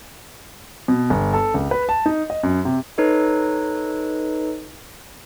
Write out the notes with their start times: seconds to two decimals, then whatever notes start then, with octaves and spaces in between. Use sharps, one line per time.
0.88 B2
1.10 G1
1.34 A4
1.54 C#2
1.71 B4
1.89 A5
2.06 D#4
2.30 D#5
2.43 F#2
2.65 C3
2.98 D#4 A4 B4 C#5 D#5